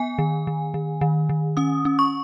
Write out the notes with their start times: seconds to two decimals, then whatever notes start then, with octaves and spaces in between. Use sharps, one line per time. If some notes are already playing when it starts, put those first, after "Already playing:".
Already playing: B3 G#5
0.18 D#3
0.47 D#3
0.74 D#3
1.01 D#3
1.29 D#3
1.57 C#4 D#6
1.85 C#4
1.99 C#6